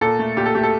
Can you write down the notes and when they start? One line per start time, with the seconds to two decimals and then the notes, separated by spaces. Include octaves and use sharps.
0.01 A#2 A4
0.19 A3
0.37 A#2 G4
0.46 A4
0.55 A3 G4
0.63 A4